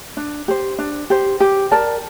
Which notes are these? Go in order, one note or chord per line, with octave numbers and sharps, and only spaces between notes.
D4
G4 C5
D4
G4 C5
G4
A#4 D5 A5